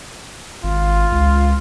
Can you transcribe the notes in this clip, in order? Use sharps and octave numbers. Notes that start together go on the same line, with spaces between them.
G#1 F4
C#2